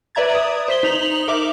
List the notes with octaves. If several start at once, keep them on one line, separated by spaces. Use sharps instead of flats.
B4 D5 E5 A#5 G#6 A6
D#6
C5 B6 G7
D#4 F7 F#7
A#4 E5 D6